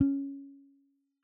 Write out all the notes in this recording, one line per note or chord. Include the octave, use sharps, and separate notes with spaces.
C#4